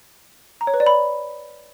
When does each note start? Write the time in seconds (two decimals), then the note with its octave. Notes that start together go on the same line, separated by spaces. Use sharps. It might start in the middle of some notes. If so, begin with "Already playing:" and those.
0.61 A#5
0.67 C#5
0.74 B4
0.80 D5
0.87 B5